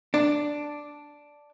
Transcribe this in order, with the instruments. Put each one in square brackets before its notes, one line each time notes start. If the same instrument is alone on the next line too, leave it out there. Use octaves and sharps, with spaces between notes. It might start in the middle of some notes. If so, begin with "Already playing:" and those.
[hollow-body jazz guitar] D4